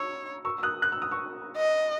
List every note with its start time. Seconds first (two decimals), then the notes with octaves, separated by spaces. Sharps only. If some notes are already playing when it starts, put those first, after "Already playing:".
Already playing: C#5 C#6 E6
0.45 C#6 E6
0.58 E6
0.63 D#6 F#6
0.82 F#6
0.92 E6
1.02 D#6
1.11 C#6 E6
1.57 D#5